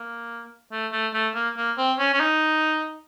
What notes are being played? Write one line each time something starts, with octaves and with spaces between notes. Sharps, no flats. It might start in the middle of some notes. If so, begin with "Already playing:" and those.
Already playing: A#3
A3
A3
A3
A#3
A#3
C4
C#4
C#4
D#4